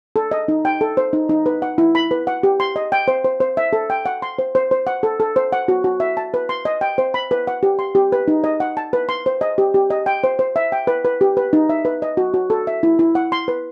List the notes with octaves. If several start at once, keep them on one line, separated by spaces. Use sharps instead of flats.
A4
D#5
D#4
G5
A4
C5
D#4
D#4
B4
F#5
E4
B5
B4
F#5
G4
C6
D#5
G5
C5
C5
C5
E5
A4
G5
F#5
C6
C5
C5
C5
F#5
A4
A4
C5
F#5
F#4
F#4
E5
A5
B4
C6
D#5
G5
C5
B5
B4
F#5
G4
C6
G4
B4
D#4
D#5
F#5
A5
B4
C6
C5
D#5
G4
G4
D#5
G5
C5
C5
E5
G5
B4
B4
G4
B4
D#4
E5
B4
D#5
F#4
F#4
A4
E5
E4
E4
F#5
C6
B4